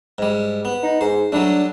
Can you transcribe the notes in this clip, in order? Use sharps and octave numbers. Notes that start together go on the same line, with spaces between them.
G#2 G3
B3
D#4
G#2 C5
F#3 G3 A3 D4